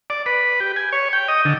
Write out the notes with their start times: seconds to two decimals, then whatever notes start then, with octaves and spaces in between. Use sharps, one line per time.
0.10 D5
0.26 B4
0.60 G4
0.76 G#5
0.93 C#5
1.13 G5
1.28 D#5
1.45 D3